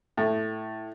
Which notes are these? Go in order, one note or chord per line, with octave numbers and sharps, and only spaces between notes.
A2